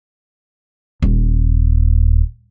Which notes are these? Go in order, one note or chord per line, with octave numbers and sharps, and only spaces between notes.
D#1